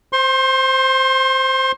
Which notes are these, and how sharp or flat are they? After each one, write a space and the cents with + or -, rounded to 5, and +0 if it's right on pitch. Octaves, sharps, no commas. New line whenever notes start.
C5 +0 C6 +35